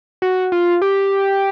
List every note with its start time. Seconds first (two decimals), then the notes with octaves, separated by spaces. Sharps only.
0.22 F#4
0.52 F4
0.82 G4